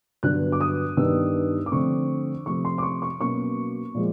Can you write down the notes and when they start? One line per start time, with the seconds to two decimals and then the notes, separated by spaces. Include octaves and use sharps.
0.23 G2 D3 F#3 B3 F#6
0.52 D6
0.61 D#6
0.97 G2 D#3 G3 B3 D4 E6
1.66 D6
1.72 D3 F3 A3 C4 C#6
2.46 C3 F3 A3 C#6
2.65 C6
2.78 D6
2.83 C#6
3.02 C#6
3.20 B2 F#3 A#3 C#4 C#6
3.94 A#2 F3 G#3